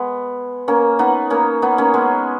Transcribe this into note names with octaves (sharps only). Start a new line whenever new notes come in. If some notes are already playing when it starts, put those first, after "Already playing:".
Already playing: G#3 B3
A#3 C#4
B3 D#4
A#3 C#4
B3 D#4
A#3 C#4
G#3 B3